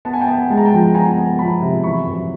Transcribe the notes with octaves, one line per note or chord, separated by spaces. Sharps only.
B3 A5
G#5
G5 A5
B3
G#3 A5
A#5
G5 A5
F3
B3 G#5 A#5
B3
F3 A5 B5
C3
E3 B5 C#6
F#2